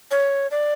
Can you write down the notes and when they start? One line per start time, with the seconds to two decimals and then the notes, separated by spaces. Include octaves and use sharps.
0.11 C#5
0.51 D5